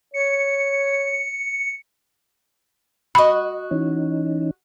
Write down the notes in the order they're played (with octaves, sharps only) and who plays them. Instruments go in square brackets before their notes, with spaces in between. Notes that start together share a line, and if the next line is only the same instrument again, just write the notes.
[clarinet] C#5 [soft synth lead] C#7
[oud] F#4 D#5 [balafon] B5
[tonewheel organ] E3 C#4 D#4